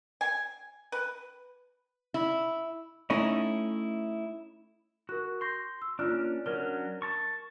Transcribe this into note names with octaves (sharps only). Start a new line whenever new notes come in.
G#5
B4
E4
A3 C#4 D#4 E4
F#4 A#4 F#6
C6 C#6 G6 A#6
E6
A#3 C#4 D4 F4 F6 F#6
F#3 C#4 D4 A#4 F6 G7
A5 C#6